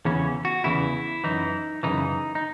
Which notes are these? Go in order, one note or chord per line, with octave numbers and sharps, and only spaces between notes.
E2 C#3 E3 C#4
F#4
E2 C#3 E3 E4
F#2 E3 D#4
F#2 C#3 E3 D#4
D#4